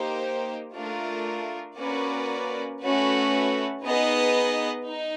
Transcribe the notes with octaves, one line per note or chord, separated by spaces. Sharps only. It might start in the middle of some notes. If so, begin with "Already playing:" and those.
Already playing: A#3 D#4 G4 C5
A3 D4 F4 A#4
A#3 C#4 F#4 B4 D5
A3 C#4 F#4 B4
B3 D#4 G#4 B4 D#5
D#4